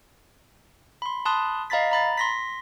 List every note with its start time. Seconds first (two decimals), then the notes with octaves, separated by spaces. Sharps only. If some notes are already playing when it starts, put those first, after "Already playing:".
1.02 B5 C6
1.25 A5 B5 C6 D#6 F#6
1.70 D#5 F5 A#5 B5 A6 B6
1.91 A#5 B5 A6
2.18 C6 A#6 B6